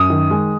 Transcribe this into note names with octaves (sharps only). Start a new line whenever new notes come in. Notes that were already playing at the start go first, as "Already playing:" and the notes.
Already playing: F#2 D#6
D#3
G#3